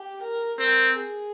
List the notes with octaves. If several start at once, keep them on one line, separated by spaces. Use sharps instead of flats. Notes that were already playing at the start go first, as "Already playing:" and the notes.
Already playing: G4
A#4
C4 A#4
G#4